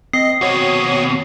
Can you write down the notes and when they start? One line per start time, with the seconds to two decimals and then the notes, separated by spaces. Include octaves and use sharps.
0.13 C4 D#5 C7
0.41 D#2 B2 F#4 C#5 D#6